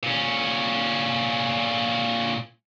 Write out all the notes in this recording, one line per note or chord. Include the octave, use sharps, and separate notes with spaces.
A#2 C#4